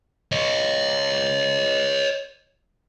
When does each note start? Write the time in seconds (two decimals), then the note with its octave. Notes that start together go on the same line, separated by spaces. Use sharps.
0.32 C#5 D#5